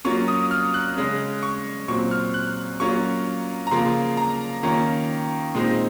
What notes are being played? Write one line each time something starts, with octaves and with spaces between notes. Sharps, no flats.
F#3 A#3 C#4 F4 C#6
D#6
F6
F#6
C#3 G#3 C#4
C#6
A#2 F#3 C4 C#6
F6
F#6
F#3 A#3 C#4 F4 C#6
A#5
C#3 F3 A#3 F4 C6
A#5
D#3 A#3 C#4 F4
A#2 G#3 C4 D#4